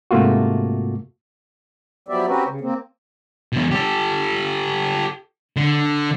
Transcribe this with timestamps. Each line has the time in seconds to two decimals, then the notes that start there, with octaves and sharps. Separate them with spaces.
0.11 G#2 C3 A3 A#3 F4 F#4
2.08 F3 F#3 B3 G4 D5 E5
2.27 C4 C#4 F#4 G4 A#4 B4
2.46 C#3
2.61 A#3 C4
3.53 E2 B2
3.71 G4 A4
5.57 D3